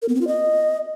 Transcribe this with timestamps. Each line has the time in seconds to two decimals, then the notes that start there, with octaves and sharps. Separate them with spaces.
0.02 A#4
0.09 B3
0.15 C4
0.21 F4
0.28 D#5